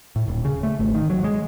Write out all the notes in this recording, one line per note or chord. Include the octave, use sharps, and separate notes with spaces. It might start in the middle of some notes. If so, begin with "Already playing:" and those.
A2
D#1
C#3
A3
G#1
D#3
F#3
G#3